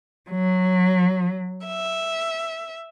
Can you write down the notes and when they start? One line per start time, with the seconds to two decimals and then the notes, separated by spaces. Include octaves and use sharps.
0.30 F#3
1.66 E5